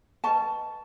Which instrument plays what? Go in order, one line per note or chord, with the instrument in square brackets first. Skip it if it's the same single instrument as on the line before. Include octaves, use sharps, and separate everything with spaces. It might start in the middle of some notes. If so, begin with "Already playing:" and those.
[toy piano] B4 D#5 G5 A#5 C#6 [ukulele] A5